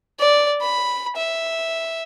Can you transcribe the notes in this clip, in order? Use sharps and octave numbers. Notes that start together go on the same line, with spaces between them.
D5
B5
E5